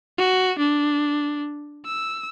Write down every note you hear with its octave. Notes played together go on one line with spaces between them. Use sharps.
F#4
D4
E6